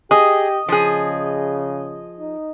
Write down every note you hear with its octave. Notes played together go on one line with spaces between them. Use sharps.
G4 G#4 D#5
C#3 F3 G#4
D#4